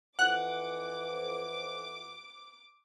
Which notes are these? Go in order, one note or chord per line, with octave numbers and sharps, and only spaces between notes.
F2 E3 F#5 D6 F#6